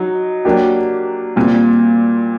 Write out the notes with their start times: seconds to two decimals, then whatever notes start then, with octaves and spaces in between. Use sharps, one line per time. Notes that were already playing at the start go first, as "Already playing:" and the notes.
Already playing: F#3 D#4
0.45 F#3 A#3 D4 G4
1.36 A#2 G3 C4